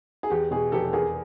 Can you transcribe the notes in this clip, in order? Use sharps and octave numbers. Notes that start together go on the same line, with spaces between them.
G#4
E2 G4
B2 G#4
F1 G4 A4
E2 G#4 A#4